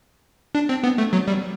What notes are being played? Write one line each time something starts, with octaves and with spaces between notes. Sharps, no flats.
D4
C4
B3
A3
F#3
G3